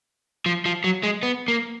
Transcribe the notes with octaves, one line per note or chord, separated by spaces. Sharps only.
F3
F3
F#3
G#3
B3
A#3